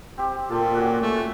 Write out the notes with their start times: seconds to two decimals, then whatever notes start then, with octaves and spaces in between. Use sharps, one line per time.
0.18 C4 G4
0.49 A#2 F4 A4 A5
0.75 C#4 F#4 F#5
1.02 A3